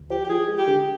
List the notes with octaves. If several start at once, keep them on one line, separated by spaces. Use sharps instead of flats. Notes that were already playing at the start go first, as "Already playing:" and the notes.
Already playing: D2
F3 G4
G4
F3 G#4
G#3
G4
D3